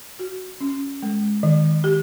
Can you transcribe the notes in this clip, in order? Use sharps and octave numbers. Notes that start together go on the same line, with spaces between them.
F#4
C#4
G#3
D#3
G4